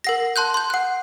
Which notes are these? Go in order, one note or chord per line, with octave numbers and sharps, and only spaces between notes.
A#4 F#5 A#6
A5 C6 F#6 G6
C6 G6
F#5 F#6